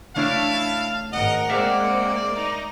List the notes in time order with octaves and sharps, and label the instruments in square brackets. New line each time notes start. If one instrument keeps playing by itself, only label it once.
[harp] A3 D4 C#5 [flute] E4 [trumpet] F5 [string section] A5
[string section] G#1 A#4 [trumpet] D#5 [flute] F#5
[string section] G#3 A#3 C4 [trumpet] D5 [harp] E5 F5
[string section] D#4 [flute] A#5